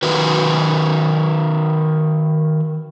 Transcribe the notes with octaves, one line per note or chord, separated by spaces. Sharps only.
D#3 F#4 B4